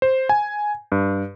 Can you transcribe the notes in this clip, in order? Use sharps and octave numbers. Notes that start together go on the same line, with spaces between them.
C5
G#5
G2